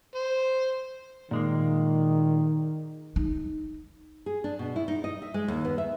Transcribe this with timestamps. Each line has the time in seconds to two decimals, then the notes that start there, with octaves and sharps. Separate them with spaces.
0.15 C5
1.31 A#2 D#3 G#3 A#3
3.16 D#4
4.26 G#4
4.44 D4
4.59 B2
4.76 E4
4.88 D#4
5.04 D#5
5.22 E5
5.34 G#3
5.48 D#2
5.65 B3
5.78 E5